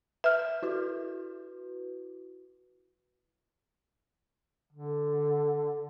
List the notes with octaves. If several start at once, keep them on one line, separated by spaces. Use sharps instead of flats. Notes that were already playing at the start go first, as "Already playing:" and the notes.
B4 E5 F6
E4 F#4 B4
D3